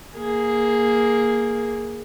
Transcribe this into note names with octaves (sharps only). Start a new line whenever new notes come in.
A#3 G#4